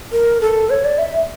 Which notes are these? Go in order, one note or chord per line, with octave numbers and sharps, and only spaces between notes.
A#4
A4
C#5
D5
E5